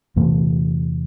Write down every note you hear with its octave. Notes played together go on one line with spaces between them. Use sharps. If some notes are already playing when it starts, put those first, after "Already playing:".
E2 C3 E3 A3